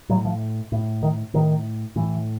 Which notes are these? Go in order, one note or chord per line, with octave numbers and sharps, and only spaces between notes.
A2 F#3
F3
A2
D#3
A2 D#3
A2 E3